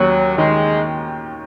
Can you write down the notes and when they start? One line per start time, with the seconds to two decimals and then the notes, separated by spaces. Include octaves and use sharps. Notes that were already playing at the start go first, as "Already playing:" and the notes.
Already playing: D#2 F#3 C#4
0.38 D#3 G#3